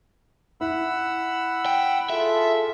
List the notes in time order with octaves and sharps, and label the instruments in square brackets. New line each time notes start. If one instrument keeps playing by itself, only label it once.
[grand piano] E4 [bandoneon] F#5 B5 E6
[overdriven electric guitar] G5
[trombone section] F4 G#4 A4 [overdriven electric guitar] E5